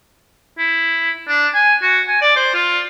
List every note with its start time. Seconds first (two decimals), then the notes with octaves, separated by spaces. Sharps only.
0.58 E4
1.28 D4
1.54 G#5
1.82 F#4
2.08 G#5
2.22 D5
2.36 C5
2.54 F4